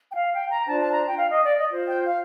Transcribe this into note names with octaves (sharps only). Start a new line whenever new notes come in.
G5
F5
G5
A#5
D4 F4 C5 A5
A5
A#5
G5
F5
D#5
D5
D#5
F4 C5
G5
F5